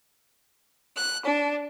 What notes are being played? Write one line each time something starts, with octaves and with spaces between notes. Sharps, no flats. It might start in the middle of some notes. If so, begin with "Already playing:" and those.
F#6
D4